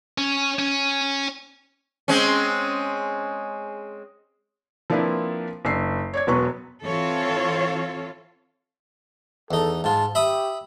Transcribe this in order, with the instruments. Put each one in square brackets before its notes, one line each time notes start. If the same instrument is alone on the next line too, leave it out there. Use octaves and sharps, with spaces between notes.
[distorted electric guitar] C#4
C#4
[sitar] G#3 C4 C#4
[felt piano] F3 A#3 C4 D4 E4 B4
F#1 D4 E6 C7
C#5 D5 G#6
E1 F#3 B3 B4 C6 C#6
[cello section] E3 C4 F4 A4 C#5 F5
[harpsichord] E2 D#4 [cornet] A4
[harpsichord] G#2 F4 [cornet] A5
[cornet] G4 [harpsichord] E5 B5 D#6